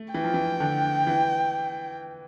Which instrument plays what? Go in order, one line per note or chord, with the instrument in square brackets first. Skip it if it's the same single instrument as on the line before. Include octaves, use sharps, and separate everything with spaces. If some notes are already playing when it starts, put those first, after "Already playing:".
Already playing: [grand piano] A3
[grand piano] E3 [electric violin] G5
[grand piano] F3
E3
D3
E3